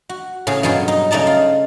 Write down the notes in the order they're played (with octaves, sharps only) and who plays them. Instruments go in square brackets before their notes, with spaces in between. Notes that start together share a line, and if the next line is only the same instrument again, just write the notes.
[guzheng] F#4
A2 C#3 G#4
G2 B2 F#3 F4 G#4
D#4
C#3 A3 D#4 D5 A5
F4